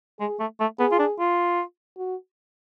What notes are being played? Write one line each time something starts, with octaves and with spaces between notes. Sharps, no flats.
G#3 G#4
A3
A3
B3 G#4
F4
D4
F4
F#4